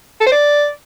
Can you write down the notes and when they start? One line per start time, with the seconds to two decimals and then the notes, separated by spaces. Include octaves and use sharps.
0.21 A4
0.26 C5
0.32 D5